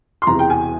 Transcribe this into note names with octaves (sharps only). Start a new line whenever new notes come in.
C6
E1 E2 C3 E3 A#5
G5
G#5